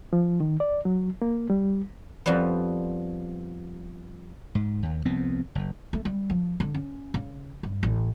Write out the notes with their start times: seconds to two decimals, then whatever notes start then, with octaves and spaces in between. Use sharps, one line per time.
0.13 F3
0.40 D#3
0.60 D5
0.85 F#3
1.22 A#3
1.50 G3
2.26 F2 F3 G3 B3
4.55 G#2
4.83 D#2
5.05 C2 F3 B3 C4
5.55 F#1
5.93 A3
6.05 G3
6.30 F3
6.60 D3
6.74 C#4
7.14 C#3
7.63 G2
7.83 A1